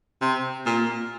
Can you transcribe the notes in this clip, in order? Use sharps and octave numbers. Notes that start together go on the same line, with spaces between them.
C3
A#2